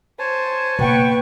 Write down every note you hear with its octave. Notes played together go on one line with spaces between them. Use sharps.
C5 C#5 G#5 A5
B2 A#3 B4 F#5 G5 C#6